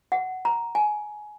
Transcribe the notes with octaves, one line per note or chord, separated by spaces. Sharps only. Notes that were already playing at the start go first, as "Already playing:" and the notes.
F#5
A#5
G#5